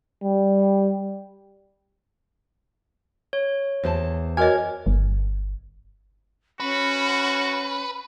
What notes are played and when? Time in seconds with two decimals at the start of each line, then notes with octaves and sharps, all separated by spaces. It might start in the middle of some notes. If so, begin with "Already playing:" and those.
0.23 G3
3.33 C#5
3.83 E2 C5 A5
4.37 F#4 A#4 C#5 D#5 G#5 F6 G#6
4.86 G1
6.60 C#4 F#4 B4